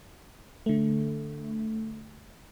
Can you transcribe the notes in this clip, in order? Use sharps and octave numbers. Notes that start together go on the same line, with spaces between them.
D3 A3